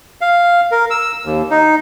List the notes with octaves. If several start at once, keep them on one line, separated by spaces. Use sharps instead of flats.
F5
A#4
E6
D#2
D#4